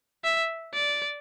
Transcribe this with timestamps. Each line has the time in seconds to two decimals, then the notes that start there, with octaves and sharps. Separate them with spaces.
0.24 E5
0.74 D5